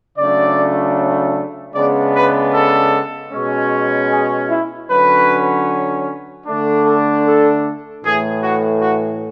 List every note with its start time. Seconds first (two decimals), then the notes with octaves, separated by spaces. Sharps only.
0.18 C#3 F#3 A3 D4 D5
1.75 C#3 G#3 B3 D4 D5
2.14 B4
2.53 A4
3.32 B2 G#3 C#4
4.11 G#4
4.51 E4
4.89 D3 F#3 C#4 B4
6.46 D3 A3 D4
6.85 A4
7.25 A4
8.04 A2 E3 A3 G#4
8.43 F#4
8.82 F#4